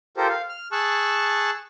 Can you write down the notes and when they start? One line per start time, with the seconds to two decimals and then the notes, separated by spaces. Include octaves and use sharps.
0.17 F4 G4 A4 A#4 C5
0.29 F5
0.49 F6
0.72 G#4 A5 C#6 E6 F#6